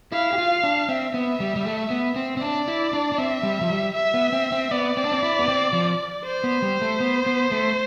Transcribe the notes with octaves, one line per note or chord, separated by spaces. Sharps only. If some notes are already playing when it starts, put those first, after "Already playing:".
E4 F5
G4
F4
D4
C4 E5
B3
G3
G3
A3
B3
C4
C4
D4 D5
E4
D4
D4
C4 E5
G3
F3
G3
E5
B3
C4
C4
B3 D5
C4
D4
C4
E4
B3
C4
F3
C5
B3
G3
A3
B3
B3
A3